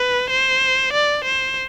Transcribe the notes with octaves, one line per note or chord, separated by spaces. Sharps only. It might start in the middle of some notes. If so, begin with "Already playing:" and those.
Already playing: B4
C5
D5
C5